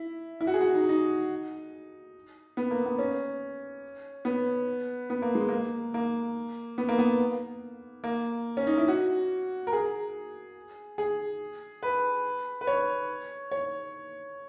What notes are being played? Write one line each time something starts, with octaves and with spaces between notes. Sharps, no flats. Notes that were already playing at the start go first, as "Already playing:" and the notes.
Already playing: E4
E4
F#4
G#4
F#4
D#4
D#4
B3
A#3
B3
C#4
B3
B3
A#3
G#3
A#3
A#3
B3
A#3
B3
A#3
C#4
D#4
E4
F#4
A#4
G#4
G#4
B4
B4
C#5
C#5